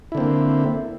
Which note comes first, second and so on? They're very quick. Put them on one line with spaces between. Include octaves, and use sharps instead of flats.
E4 D3 C4 A#3